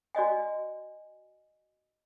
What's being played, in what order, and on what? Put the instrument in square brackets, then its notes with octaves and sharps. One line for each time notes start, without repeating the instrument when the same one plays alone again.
[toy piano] F#4 D5 D#5 G#5